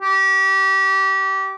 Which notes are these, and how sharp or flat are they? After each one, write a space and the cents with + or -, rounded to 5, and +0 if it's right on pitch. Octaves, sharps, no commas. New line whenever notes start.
G4 -25